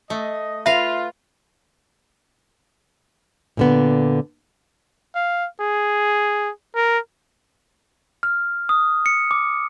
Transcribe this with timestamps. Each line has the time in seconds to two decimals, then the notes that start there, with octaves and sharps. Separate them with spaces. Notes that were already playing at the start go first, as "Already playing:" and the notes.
0.10 A3 D#5
0.66 F4 B4 E5 F5
3.57 A#2 D3 B3
5.15 F5
5.60 G#4
6.76 A#4
8.23 F6
8.69 D#6
9.06 C#7
9.31 D6